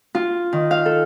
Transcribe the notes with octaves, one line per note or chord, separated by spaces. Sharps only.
F4
D#3
F5
A4